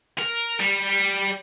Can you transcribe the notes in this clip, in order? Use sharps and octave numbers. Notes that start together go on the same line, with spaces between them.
A#4
G3